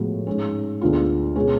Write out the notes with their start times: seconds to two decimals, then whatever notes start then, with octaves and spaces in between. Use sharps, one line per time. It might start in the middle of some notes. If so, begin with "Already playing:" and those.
Already playing: A2 F3 G#3 B3 F#4
0.27 G#2 G#3 C#4
0.81 D2 D3 G#3 B3 F4
1.36 B2 G#3 C#4 G#4